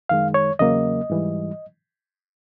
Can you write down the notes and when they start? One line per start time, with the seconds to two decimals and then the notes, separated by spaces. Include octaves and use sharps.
0.09 F#2 D#3 G#3 F5
0.34 C#5
0.59 E2 C#3 F#3 A#3 D#5
1.10 G#2 E3 G3